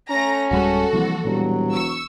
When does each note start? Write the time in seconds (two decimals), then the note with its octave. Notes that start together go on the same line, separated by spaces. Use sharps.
0.11 A3 C#4 A#5 A#6
0.51 D1 G3 G#3 F#4 A4
0.93 C2 E3 F3 A#3
1.25 E1 A#2 F#3 G3
1.73 C#6 E6